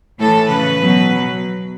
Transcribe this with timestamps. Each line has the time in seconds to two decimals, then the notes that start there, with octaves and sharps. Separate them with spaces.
0.20 A2 E3 A4
0.49 C#3 E3 B4
0.79 B2 F#3
1.09 B2 F#3